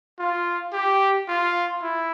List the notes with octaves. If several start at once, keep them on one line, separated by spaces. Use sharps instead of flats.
F4
G4
F4
E4